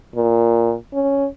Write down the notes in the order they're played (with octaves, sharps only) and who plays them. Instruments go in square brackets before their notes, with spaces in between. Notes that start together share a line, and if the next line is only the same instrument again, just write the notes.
[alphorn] A#2
C#4